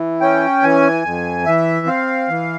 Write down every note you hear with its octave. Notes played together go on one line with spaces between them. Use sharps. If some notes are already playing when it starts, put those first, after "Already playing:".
Already playing: E3
C#4 G5
E3 G#5
F2
E3 E5
C4 F5
E3